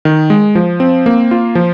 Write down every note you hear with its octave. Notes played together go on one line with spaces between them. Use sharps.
D#3
G#3
F3
C4
A#3
F4
F3